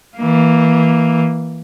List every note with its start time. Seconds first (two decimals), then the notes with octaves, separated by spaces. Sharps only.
0.17 E3 A#3